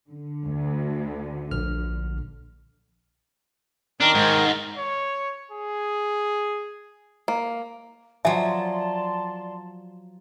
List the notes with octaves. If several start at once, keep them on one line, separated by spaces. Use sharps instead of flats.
D3
D2
A#1 F6
D#3 D4 A#4
G#2
C#5
G#4
A#3
F3 F#3 D5 E5 G#5 A5 C6